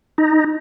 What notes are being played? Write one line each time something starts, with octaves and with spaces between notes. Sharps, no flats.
D#4